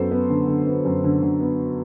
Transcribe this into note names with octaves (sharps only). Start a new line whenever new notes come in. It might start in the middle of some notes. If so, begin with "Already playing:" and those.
Already playing: F#2 B3 A4 C5
B3
D3
D3
B3
F#2
D3
D3
B3